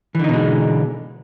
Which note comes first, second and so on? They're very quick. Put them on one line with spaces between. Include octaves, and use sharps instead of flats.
E3 D3 D#4 B2 G#3